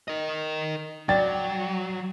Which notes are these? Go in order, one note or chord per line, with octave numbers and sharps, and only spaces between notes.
A#4 D#5
F#3 D5 G5 A6